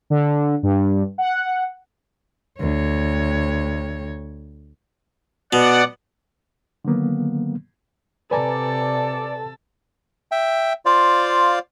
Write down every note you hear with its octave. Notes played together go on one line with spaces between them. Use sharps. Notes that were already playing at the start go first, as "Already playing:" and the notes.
D3
G2
F#5
D2 C#5
B2 D5 F#5
D3 D#3 F#3 A#3 B3
C3 A4 B4 D5 G#5 A#5
E5 G5
F4 C5 D5 F5